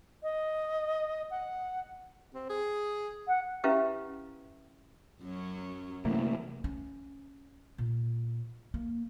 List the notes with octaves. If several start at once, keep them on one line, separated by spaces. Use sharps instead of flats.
D#5
F#5
C4
G#4
F#5
C#4 E4 G4 B4 E5 F5
F#2 F#3 C#4
F#2 C3 E3 F#3 A3 A#3
C#4
A#2
A#3